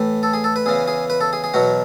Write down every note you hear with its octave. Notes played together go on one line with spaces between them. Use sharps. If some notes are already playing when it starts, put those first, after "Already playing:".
Already playing: A2 E3
A4
G#4
A4
B4
E2 C#3 E3 G#4
G#4
B4
A4
G#4
G#4
E2 B2 F#3 F#4